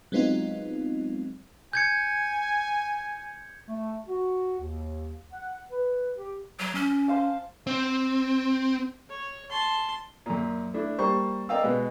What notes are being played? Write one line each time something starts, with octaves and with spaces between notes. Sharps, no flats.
F#3 G#3 B3 C4 D#4 F4
G#5 G6 G#6 C#7
A3
F#4
D#2
F#5
B4
G4
F#3
C#4
C5 F5 A5
C4
C#5
A5 C6
F#2 A#2
A3 D4 E4
G3 A#3 C5 C#6
A#4 D5 D#5 F5 G5 E6
B2 G#3 B4